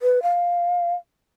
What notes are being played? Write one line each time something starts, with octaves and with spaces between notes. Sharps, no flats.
B4
F5